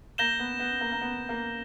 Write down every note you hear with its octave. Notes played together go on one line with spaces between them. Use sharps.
A#3 G6 A#6 E7 G7
B3
B3
A#3
A#3
B3
A#3